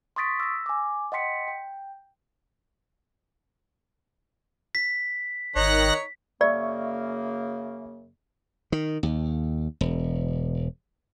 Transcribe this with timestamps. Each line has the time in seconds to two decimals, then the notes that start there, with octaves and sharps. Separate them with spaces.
0.16 C6 C#6 D#6 A6 B6 D7
0.40 E6 A#6
0.66 G#5 D6
1.12 D#5 F#5 G5 C6 B6 C#7
1.48 G5
4.75 B6
5.56 G#1 D#3 D#4 C#5 F#6 A#6
6.41 F#2 C#3 A#3 D5 E5 C#6
8.72 D#3
9.03 D#2
9.81 E1